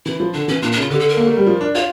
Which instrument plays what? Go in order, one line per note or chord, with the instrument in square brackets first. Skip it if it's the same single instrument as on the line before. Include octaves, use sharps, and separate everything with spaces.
[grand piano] E3 [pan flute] E4
[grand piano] F3
[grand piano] D3 [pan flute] D4
[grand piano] E3 [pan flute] C#4
[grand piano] A#2 [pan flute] D4
[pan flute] D4
[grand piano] C#3 [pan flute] F4
[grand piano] D3 [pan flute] G4
[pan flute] A4
A#4
[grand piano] A#3
A3
G3
F3
D4
[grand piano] F4 [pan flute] C#5